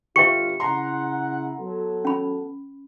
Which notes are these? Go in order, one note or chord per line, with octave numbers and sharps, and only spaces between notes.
G1 F4 G4 B4 E5 G5 C#6 C#7
C#3 E4 F#5 A#5 C6
F#3 B3 A4
C#4 B5